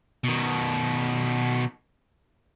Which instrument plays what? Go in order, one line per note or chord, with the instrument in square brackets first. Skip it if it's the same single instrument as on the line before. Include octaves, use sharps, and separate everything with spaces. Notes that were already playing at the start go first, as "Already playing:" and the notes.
[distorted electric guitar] B2 D#3